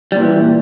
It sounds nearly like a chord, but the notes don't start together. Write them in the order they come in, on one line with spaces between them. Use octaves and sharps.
G3 A#2 E3